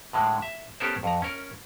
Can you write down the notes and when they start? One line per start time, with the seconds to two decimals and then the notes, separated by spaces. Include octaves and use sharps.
0.13 A2 D3 G#3
0.42 E5
0.80 B3 C#4 G4 A4 A#4 C5
1.03 F2 A#5
1.22 C#4 A#4